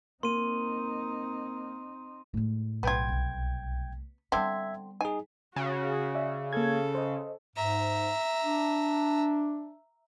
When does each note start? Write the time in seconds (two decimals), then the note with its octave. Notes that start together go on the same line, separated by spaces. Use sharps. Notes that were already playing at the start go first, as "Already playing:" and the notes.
0.23 A#3 C4 D#4 C6 D#7
2.34 A2 G#3
2.83 B1 B3 F4 G5 G#6
3.09 C2 A3
4.32 D3 G3 B3 C4 E5 G#6
5.01 D#4 G#4 G#5
5.56 C#3 F#4
6.15 D5 E5
6.53 A#3 A4 G#6
6.95 C5 D#5
7.56 G#2 E5 A#5
8.44 D4